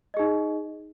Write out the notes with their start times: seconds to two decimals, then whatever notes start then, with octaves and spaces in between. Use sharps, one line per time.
0.14 D#5
0.17 G#4
0.19 D#4